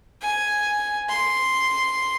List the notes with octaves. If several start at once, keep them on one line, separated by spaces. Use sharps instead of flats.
G#5
C6